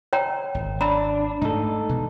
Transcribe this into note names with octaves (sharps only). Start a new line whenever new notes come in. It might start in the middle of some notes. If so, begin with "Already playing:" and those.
C#5 G5 A#5
G#1
D4 A#5 B5
G#2 A3 D#4 A4
B2 E3